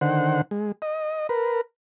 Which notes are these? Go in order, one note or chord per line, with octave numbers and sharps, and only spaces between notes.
D3 D#3 C5 F#5
G#3
D#5
A#4 B4